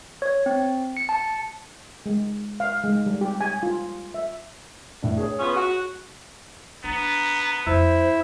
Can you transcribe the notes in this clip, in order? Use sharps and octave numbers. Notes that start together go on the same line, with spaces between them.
C#5
C4
C#7
A5
G#3
F5
G#3
G3
G4
G#5
F4
E5
A2 D4
G#4 C#5
B3 C#4 F4
F#4
B3 D4 A#5
F2 E4 C5